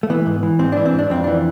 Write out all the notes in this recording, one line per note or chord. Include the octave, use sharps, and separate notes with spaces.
A3
E3 B3
G#2
E3
G#2 C4
E3 D4
C4
G#2
D4
F2 C4
E3 D4